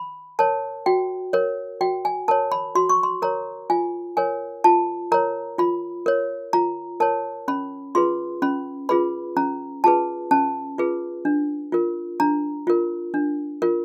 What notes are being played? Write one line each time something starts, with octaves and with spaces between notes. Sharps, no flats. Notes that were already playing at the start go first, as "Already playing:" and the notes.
Already playing: B5
A#4 C#5 A5
F#4 G5
A#4 C#5
F#4 G5
G#5
A#4 C#5 A5
B5
F#4 C6
C#6
C6
A#4 C#5 A#5
F4 G#5
A#4 C#5 G#5
F4 A5
A#4 C#5 A#5
F4 B5
A#4 C#5
F4 A#5
A#4 C#5 A5
C#4 B5
F4 G#4 B4 C6
C#4 B5
F4 G#4 B4 B5
C#4 A#5
F4 G#4 B4 A5
C#4 A5
F4 G#4 B4
D4
F4 A#4
D4 A#5
F4 A#4
D4
F4 A#4